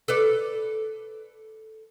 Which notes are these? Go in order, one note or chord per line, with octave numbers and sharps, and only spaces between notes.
A4 B4 D5